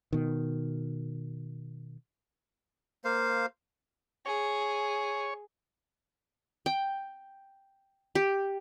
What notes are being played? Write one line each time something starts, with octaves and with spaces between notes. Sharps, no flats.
B2 D#3
A#3 C5 F5
G#4 C#5
G5
G4